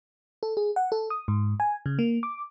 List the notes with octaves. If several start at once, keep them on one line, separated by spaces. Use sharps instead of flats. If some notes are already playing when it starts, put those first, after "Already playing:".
A4
G#4
F#5
A4
D#6
G#2
G#5
C#3
A#3
D6